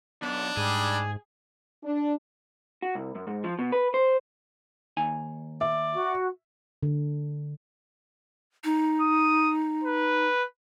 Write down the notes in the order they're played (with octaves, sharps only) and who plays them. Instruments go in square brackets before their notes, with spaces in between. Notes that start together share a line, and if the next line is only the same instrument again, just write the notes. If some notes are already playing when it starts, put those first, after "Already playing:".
[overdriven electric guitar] B1 B3 [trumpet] D4
[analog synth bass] G#2 [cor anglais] G3 [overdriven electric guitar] G#4
[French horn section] D4
[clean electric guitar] F#4
C2
F#2
G#2
F3
B2
B4
C5
[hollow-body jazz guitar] D#2 D#4 G#5
[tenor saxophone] D5 [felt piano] E5
[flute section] F#4
[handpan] D3
[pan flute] D#4
[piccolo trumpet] D#6
B4